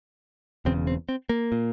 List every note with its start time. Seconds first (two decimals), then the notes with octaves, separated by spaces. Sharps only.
0.65 E1 E2 C#3 C4
0.87 C4
1.09 C4
1.29 A#3
1.52 A#2